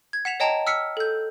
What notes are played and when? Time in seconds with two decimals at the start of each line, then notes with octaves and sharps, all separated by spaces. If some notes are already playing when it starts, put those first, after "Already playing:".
0.13 G#6
0.25 F#5 B6 E7 F7
0.40 C#5 D#5 G5 A5 A#5
0.67 E6 F6 B6 C#7
0.97 A4 G6